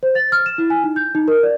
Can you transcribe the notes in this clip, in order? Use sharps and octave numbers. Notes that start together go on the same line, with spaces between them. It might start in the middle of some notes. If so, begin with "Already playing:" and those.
C5
A6
F6
E7
E4
G#5
D#4
G6
D#4
A#4
D5